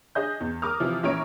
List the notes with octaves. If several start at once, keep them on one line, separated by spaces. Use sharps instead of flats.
D4 G#4 D#5 G6
E2
A#4 D6 D#6 F6
C3 E3 F3
A#1 E3 C#4 C#5 A#5 D7